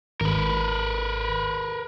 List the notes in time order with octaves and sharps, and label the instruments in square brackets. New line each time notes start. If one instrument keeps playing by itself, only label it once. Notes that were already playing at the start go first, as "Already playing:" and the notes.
[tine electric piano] G#1 [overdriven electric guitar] A#4 B4